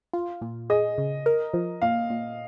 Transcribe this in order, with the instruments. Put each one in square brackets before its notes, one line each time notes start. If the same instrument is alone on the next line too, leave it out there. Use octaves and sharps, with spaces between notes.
[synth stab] F4
A#2
[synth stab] G#4 [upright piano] D#5
[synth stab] C#3
A#4
F3
[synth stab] A#2 [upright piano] F5
[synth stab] A#2